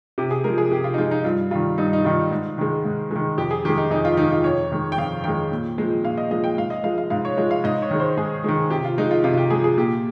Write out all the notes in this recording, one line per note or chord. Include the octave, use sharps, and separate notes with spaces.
C3 G4
G#4
F3 G#3 A#4
G#4
C3 G4
F4
D#4
F3 G#3 F4
D#4
G2 F4
D#3 G3 F4
G2 D#4
D#4
D#3 G3 F4
G#2
D#3 G#3
G#2
D#3 G#3
F2 G4
G#4
D#3 G#3 G4
D#4
F2 D#4
F4
D#3 G#3 D#4
F4
F2 C#5
D#3 G#3
G5
F2 F5
D#3 G#3 G5
A#2
F3 G#3
A#2 F5
D#5
F3 G#3 D#5
G5
G#2 F5
D#5
F3 G#3 F5
F5
G#2 F5
C#5
F3 G#3 D#5
F5
G#2 D#5
C#5
D#3 G#3
C5
G#2 G#4
D#3 G#3
C3 G4
F4
F3 G#3 D#4
F4
C3 F4
F4
G4
F3 G#3 G#4
G#4
A#2 G4